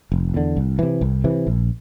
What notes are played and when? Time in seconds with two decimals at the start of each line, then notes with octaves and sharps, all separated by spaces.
0.12 F1
0.34 E2 D3
0.57 C2
0.79 C3 E3
1.01 C2
1.24 C3 E3
1.47 A#1